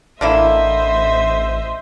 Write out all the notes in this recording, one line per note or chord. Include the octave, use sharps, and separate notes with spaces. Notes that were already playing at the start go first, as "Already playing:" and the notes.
A1 D3 A#3 E4 C5 D#5 E5